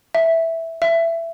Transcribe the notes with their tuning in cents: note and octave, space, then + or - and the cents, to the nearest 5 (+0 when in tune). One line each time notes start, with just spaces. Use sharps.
E5 -5
E5 +15